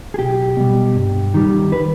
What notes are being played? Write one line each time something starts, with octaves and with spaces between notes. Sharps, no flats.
G#4
B1 G4
B2 G3
G2
D#3 G3
B4